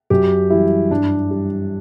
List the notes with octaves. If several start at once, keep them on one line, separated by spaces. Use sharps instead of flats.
F#2 G4
E3 G3 E4
G2 D4
G3